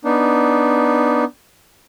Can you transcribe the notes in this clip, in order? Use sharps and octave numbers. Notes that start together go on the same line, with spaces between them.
B3 D4 D#4